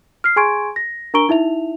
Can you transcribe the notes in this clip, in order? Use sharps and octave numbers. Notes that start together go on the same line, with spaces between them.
F6 C7
G#4 G#5 C6 C#6 G#6 D7
A#6
D4 A#4 A#5 C#6 D7 G7
D#4 E4 E5 F7